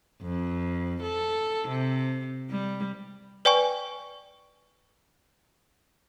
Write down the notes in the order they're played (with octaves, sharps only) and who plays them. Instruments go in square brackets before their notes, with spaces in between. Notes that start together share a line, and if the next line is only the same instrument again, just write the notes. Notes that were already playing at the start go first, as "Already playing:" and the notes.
[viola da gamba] F2
A4
C3
G3
[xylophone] B4 D5 G5 G#5 C#6